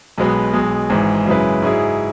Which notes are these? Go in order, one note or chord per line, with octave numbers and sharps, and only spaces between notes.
B1 B2 G#3 B3
B1 B2 G#3
G#1 G#2 E3
F#2 C#3 G#3 E4 B4
G#2 F#3 E4 G#4